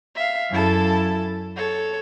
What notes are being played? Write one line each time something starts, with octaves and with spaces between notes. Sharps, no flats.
E5 F5
F#2 E4 A4 A5
A4 C#5